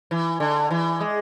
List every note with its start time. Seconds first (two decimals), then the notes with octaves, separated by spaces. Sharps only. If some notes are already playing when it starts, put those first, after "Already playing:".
0.11 E3
0.40 D3
0.71 E3
1.00 G#3